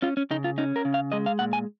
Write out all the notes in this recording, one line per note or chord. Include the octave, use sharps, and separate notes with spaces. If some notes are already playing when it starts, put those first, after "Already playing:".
C#4 F4
C#4
C#3 D#4
F4
C#4 D#4
A#4
C#3
F5
G#3 D#5
F5
A#2 F#5
G#5